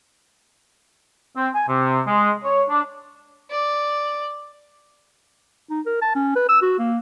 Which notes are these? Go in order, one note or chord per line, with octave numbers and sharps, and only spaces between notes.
C4
G#5
C3
G#3
C#5
D4
D5
D#4
A#4
A5
C#4
B4
E6
F#4
A#3